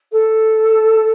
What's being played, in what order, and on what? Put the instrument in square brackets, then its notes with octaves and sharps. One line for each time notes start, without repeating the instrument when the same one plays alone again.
[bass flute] A4